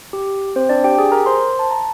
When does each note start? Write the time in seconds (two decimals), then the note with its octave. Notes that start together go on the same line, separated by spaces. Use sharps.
0.13 G4
0.56 C4 C5
0.69 D4 D5
0.84 G4 G5
0.98 G#4 G#5
1.12 A#4 A#5
1.26 C5 C6
1.59 A5
1.71 A#5